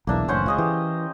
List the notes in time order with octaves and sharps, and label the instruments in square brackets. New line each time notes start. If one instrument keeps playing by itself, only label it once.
[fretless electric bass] B1 E2 E3 [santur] A#3 D4 E5
[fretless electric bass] F#1 A2 E3 [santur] C#4 C5 F#5
[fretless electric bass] C#2 [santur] G#4 D#5 F5
[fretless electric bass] E3 [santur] G4